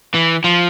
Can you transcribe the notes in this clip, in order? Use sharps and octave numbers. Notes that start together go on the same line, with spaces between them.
E3
F3